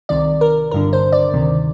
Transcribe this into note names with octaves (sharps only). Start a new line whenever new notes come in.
C2 C3 D#3 D5
A#4
G1 G2 D3 A#4
C5
D5
D2 C3 D#3